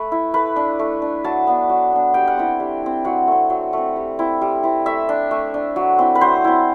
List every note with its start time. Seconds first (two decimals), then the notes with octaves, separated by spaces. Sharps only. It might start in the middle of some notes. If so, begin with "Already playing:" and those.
Already playing: A3 B4
0.12 E4
0.34 A3 B4
0.56 D4
0.79 A3
1.02 D4
1.24 F#3 A5
1.47 B3 D4
1.69 F#3
1.92 B3 D4
2.14 G3 G5
2.28 F#5
2.37 C4 E4 G5
2.60 G3
2.83 C4 E4
3.05 F#3 F#5
3.28 A3 C4
3.50 F#3
3.73 A3 C4
3.96 G3
4.19 C4 E4
4.41 G3
4.63 C4 E4
4.86 A3 E5
5.09 D4
5.31 A3
5.54 D4
5.76 F#3
5.99 C4 E4
6.15 B4
6.21 F#3 C5
6.44 C4 E4